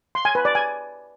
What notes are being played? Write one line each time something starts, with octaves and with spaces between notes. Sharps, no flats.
C6
G#5
B4
D5
G#5